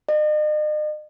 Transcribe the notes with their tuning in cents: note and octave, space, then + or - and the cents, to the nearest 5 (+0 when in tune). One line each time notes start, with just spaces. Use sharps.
D#5 -45